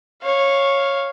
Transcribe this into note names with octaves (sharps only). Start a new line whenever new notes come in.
C#5 F5